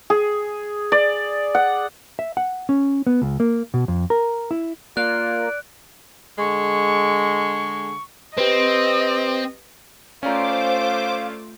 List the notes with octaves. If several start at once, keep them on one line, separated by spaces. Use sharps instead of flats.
G#4
D5
F#5
E5
F#5
C#4
B3
C#2
A#3
B2
F2
A#4
E4
A#3 F4 D5 F#6
D3 G#3 C#6
C4 G4 B4 D#5
A3 C#4 F4 C5 D5 F5 A#5 D6